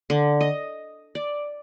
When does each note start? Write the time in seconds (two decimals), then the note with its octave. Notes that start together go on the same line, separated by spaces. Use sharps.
0.10 D3
0.41 D#5
1.15 D5